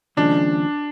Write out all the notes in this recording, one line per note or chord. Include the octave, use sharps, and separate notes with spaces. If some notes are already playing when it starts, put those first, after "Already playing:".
D#2 C#3 F3 G#3 D4